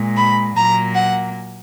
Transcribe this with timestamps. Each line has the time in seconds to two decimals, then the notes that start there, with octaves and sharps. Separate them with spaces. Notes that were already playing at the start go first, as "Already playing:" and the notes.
Already playing: A#2 G#3
0.16 B5
0.56 A#2 F#3 A#3 A#5
0.94 F#5